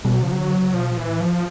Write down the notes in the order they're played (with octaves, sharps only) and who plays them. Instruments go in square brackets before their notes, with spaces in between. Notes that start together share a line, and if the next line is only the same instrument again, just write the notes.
[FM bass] B2 [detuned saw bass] G3
[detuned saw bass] F#3
[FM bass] C#3 [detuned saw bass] F3
[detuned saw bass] F#3
[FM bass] D3
C#3
[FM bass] B2 [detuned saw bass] F3
[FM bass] A#2
[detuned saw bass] E3
[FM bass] A2
[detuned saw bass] F3